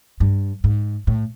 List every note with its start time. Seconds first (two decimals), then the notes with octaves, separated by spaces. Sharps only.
0.20 G2
0.64 G#2
1.07 A2